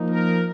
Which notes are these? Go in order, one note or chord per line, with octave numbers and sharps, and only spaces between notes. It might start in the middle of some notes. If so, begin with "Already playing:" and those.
Already playing: F3 A#3 D#4
A#4